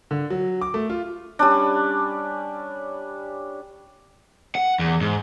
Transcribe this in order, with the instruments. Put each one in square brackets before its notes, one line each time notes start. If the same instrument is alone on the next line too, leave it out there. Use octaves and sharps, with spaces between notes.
[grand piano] D3
F#3
D6
A3
F4
[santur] G3 C#4 D4
[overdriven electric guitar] F#5
E2
G#2